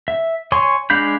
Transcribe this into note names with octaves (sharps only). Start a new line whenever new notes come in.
E5
C#5 G#5 C6 C#6
G#3 D4 F5 B5 G6